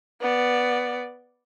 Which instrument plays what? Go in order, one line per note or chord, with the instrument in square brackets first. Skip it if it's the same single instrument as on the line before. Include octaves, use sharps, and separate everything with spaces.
[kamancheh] B3 D5